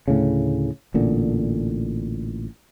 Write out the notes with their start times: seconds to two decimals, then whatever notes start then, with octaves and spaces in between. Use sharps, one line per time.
0.08 D2 A2 C#3
0.94 A1 A#2 D3